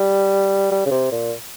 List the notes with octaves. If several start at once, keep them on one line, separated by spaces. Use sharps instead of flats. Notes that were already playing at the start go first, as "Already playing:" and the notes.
Already playing: G3
G3
C#3
C3
A#2